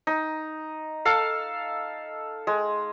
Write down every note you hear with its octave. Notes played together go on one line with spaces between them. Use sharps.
D#4
A4 F5
G#3